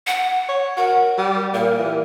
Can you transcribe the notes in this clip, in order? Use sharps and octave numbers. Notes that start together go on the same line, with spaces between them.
F#5
C#5
F#4 A#4
G3
A#2 A#4
E3